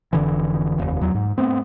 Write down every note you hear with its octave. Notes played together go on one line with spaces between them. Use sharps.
F1 D3 E3
F1 D#2
E2 F#3
G#2
A3 B3 C4